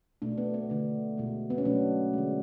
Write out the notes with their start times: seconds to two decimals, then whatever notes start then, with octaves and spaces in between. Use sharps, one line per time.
0.22 B2 A3 D4
0.38 B3
0.54 B3
0.70 D3 A3
1.18 B2 G#3
1.50 B3
1.58 C#4
1.65 B2 F#3 A3 D4
2.13 D3 G#3